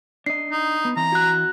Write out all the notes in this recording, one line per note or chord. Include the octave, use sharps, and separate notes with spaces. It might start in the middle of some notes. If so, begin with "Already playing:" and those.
D4 D#5 C7
D#4
B3
E3 C4 A#5
F#4 F#6